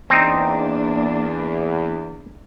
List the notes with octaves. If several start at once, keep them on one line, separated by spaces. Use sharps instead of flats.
E2 A#3 C4 D4 D#4